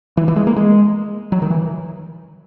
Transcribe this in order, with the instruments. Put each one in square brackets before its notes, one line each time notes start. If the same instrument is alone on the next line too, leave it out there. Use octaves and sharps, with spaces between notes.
[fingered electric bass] E3
E3
G#3
A#3
G#3
F#3
D#3
E3